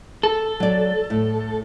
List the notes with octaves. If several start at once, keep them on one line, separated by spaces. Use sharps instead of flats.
A4
F#3 D5
A2